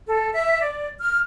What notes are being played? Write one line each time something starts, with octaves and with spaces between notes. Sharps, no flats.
A4
E5
D5
F6